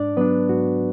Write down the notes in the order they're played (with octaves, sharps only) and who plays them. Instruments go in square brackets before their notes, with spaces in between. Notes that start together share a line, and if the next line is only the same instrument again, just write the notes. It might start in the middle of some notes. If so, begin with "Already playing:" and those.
Already playing: [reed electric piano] G#2 D4 D5
F#3 B3 D4 B4
G#2 F#4